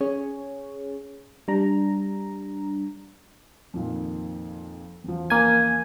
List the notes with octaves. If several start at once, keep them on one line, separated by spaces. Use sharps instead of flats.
C#4 G#4 C#5
G3 D4 A#5
F2 A#2 D#3
E2 C#3 F3
A#3 G#5